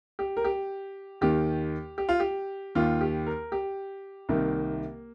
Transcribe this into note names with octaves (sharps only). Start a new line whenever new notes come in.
G4
A#4
G4
D#2 D#3 G4
G4
F4
G4
D#2 D#3 F4
G4
A#4
G4
C2 C3 D#3 A#3